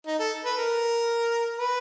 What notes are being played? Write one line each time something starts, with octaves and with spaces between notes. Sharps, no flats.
D#4
A4
B4
A#4
B4